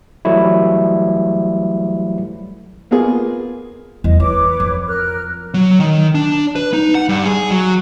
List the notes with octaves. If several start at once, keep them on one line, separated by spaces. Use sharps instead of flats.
E3 F#3 G3 A3 E4
A#3 B3 F4 G#4
E2 G3 D#5
E3 B4 C#5 D6
F2
A#4 F6 F#6
F#3
D#3
D4
B4
D#4
F#5
G2
G#4
F#3